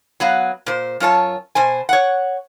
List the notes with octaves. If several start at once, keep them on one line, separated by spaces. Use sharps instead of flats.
F#3 B3 F5
A#2 C5
F#2 F4 C#5 A5
B2 C5 G#5
C#5 F#5